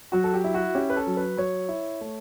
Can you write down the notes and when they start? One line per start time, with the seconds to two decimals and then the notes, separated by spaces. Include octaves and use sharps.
0.12 F#3 F#4
0.24 A4
0.34 G4
0.44 E4
0.54 F#4
0.75 C#4 G4
0.90 B4
0.96 A4
1.07 F#3
1.17 B4
1.37 F#3 C#5
1.69 E4
2.01 A3